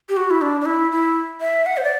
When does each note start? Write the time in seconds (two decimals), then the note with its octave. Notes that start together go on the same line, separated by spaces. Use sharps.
0.09 G4
0.17 F#4
0.30 E4
0.42 D4
0.61 D4
0.66 E4
0.92 E4
1.41 E5
1.66 F#5
1.77 C5
1.84 D5